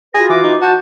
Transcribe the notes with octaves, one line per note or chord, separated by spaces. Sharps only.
F4 F#4 G#4 B4 A#6
E3 D6
D#4
F#4 A5 G6